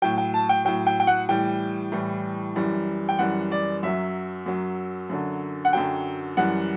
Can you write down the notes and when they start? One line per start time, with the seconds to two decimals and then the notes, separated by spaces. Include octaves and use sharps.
0.02 A2 F#3 G5
0.18 G5
0.34 A5
0.49 G5
0.65 A2 F#3 G5
0.87 G5
1.00 G5
1.07 F#5
1.29 A2 E3 G3 G5
1.92 A2 E3 G3
2.56 F#2 E3 G3
3.09 G5
3.19 F#2 E3 G3 F#5
3.52 D5
3.83 F#2 F#3 E5
4.46 F#2 F#3
5.09 F#2 D3 F#3
5.65 F#5
5.73 F#2 D3 F#3 G5
6.37 F#2 E3 G3 F#5